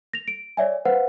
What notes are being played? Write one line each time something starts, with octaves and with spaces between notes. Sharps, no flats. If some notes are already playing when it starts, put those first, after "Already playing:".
A#6 F7
D7
C#5 D5 E5 G#5
B4 C5 F5 F#5